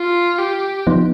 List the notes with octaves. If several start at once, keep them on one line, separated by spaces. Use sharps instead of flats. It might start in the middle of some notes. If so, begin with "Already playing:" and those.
Already playing: F4
G4
F3 B3 D#4